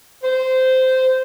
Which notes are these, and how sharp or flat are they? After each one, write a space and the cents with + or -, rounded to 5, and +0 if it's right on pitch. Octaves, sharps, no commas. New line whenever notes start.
C5 -15